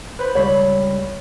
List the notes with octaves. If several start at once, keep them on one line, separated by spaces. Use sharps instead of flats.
B4 C5 B5
C#2 G3 C#5 B5